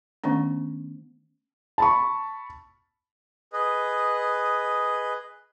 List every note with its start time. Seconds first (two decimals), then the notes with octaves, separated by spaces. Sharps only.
0.24 D#3 A3 B3 C#4 D4
1.78 A5 B5 C#6
3.53 G#4 B4 D#5